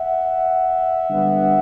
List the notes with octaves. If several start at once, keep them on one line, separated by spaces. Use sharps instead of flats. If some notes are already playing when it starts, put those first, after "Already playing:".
Already playing: E5 F#5
D3 G3 B3